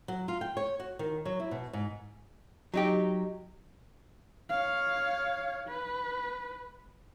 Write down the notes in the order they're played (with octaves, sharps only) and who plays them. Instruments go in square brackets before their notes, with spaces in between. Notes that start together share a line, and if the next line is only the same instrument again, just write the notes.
[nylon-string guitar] F#3
F4
G5
C#5
F#4
D#3
F#3
E4
B2
G#2
[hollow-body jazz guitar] F#3 D#4 G4
[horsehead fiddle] C#5 F5
B4